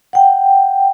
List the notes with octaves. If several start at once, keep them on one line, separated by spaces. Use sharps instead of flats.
F#5 G5